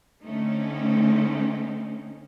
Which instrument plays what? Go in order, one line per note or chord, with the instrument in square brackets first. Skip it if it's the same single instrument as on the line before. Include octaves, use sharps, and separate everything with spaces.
[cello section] D3 A3 C4 C#4 D#4